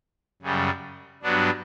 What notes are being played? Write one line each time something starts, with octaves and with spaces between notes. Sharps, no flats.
F#2 C#3 G3
G2 F#3 B3 D4